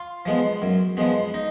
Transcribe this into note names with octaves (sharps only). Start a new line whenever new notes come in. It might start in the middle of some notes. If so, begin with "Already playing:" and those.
Already playing: F4
F3 G#3 B3
F#2
F3 G#3 B3
D#4